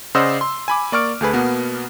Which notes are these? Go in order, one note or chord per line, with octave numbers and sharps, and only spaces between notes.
C#3 C5 D5 D#5 F#5 E6
C6
G#5 B5 D6
A#3 D5 C#6 F6 D7
D2 A3 G#4 B4
B2 A#3 B3 F#4